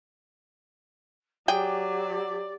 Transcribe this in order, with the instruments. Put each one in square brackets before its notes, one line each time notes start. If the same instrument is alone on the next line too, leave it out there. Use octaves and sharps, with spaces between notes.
[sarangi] F#3 [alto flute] G4 [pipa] G#4 G5 [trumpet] D5